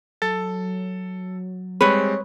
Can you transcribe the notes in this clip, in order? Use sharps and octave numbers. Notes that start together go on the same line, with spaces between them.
F#3 A4 A6
G3 G#3 C4 B4 C#5 B5